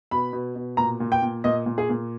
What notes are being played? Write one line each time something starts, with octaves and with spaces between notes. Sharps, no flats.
B2 B5
B2
B2
A#2 A#5
A#2
G5
A#2
A#2 D#5
A#2
G#4
A#2